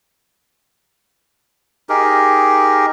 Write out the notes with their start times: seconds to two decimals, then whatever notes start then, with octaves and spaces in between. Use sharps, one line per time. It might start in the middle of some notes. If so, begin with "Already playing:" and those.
1.89 D#4 G4 G#4 A#4